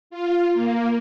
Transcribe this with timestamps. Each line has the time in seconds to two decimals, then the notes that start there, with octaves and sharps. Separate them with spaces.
0.10 F4
0.54 A#3